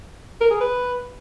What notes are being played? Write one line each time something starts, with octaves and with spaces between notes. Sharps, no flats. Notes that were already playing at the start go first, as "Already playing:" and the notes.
A#4
G#4
B4